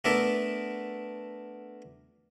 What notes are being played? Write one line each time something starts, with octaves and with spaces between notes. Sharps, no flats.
A3 B3 D4 A4 A#4 E5